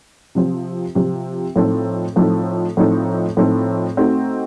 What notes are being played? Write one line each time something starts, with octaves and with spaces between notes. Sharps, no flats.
C3 F3 C4
C3 F3 C4
A2 F3 C4 D#4 A4
A2 F3 C4 D#4 A4
A2 F3 C4 D#4 A4
A2 F3 C4 D#4 A4
A3 C4 D#4 F#4